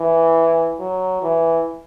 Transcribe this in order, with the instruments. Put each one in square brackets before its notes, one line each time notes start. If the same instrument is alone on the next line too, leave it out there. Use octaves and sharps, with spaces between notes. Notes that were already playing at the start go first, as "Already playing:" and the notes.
Already playing: [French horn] E3
F#3
E3